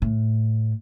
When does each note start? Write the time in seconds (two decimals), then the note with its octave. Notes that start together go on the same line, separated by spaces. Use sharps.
0.02 A2